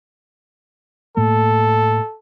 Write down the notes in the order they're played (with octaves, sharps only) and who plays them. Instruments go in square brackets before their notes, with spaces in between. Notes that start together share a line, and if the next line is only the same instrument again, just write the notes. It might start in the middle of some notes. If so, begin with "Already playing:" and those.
[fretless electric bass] A2 A3 A#3 [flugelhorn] A4